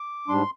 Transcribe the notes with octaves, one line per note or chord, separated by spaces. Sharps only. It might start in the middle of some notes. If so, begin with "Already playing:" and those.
Already playing: D6
G#2 G3 D4 C6